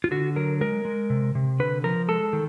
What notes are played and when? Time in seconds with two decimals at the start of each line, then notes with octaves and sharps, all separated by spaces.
0.04 F4
0.11 D3 F#4
0.36 F#3 A#4
0.61 G#3 A#4
0.85 G#3
1.10 C3
1.35 C3
1.60 D3 B4
1.84 F3 A#4
2.09 G#3 A4
2.33 D#3